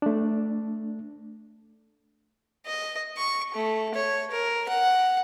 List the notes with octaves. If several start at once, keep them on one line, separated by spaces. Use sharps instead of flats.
A3 D4
D#5
C#6
A3
C#5
A#4
F#5